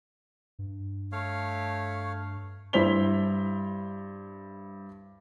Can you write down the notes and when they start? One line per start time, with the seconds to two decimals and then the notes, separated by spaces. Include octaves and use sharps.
0.59 G2
1.12 A3 C#5 F5
2.73 G2 E4 C5 B6 F7 G7